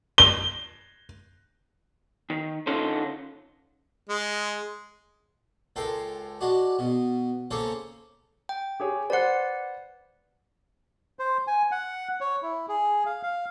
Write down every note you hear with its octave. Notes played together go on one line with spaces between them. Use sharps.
G7
D#3
D3 C#4 D#4 F4 A4 C5
G#3
C#2 A4 A#4 G5 C6
G#3 D4 F#4
B2
C#3 A#3 A4 C5 C#5
G5
G4 G#4 C#5
B4 C5 D5 F#5 F#6
C5
G#5
F#5
C#5
E4
G#4
F5
F5